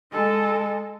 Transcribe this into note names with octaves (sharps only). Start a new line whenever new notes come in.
G#3 A4